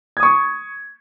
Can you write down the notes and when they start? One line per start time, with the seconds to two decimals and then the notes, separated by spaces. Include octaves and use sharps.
0.17 G#6
0.20 D#6
0.23 C#6